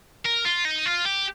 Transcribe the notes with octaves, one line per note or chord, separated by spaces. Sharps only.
A#4
F4
D#4
F4
G4